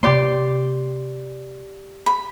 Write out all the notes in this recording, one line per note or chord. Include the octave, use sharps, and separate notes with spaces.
C3 A#3 G4 D5 C6
B5